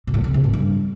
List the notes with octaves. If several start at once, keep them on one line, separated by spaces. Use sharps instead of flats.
B2
A2
C3
C3
A2
G2